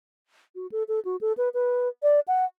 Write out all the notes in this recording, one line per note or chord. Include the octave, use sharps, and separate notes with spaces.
F#4
A4
A4
F#4
A4
B4
B4
D5
F#5